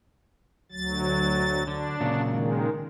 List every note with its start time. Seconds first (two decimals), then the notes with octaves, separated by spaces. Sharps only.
0.72 D2 F#3 A6
1.67 D3 D4
2.00 A#2 C#3 F#3
2.30 D#3 G#3